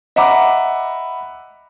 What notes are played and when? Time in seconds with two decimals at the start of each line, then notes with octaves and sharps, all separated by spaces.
0.16 D#5 E5 F#5 A#5 B5 D6